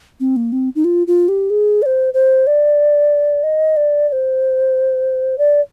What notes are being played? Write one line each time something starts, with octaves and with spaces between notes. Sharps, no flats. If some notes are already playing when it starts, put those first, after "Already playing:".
C4
A#3
C4
D#4
F4
F4
G4
G#4
D5
C5
C5
D5
D#5
D5
D5
C5
D5